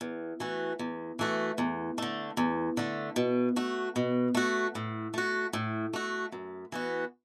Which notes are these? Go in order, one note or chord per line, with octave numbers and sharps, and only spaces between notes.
E2
E3 A3 F#4
E2
E3 A3 F#4
E2
D3 A3
E2
D3 A3
B2
A3 F#4
B2
A3 F#4
A2
A3 F#4
A2
A3 F#4
F#2
E3 B3 F#4